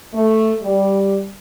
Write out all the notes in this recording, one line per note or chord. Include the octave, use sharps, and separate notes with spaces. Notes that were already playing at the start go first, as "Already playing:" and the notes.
A3
G3